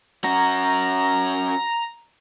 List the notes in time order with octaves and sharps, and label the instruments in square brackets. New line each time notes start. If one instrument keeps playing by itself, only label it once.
[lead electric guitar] C#4 F#4 [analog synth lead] A#5